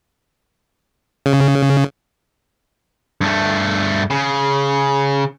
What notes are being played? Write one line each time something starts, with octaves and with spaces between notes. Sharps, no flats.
C#3
G2 A3
C#3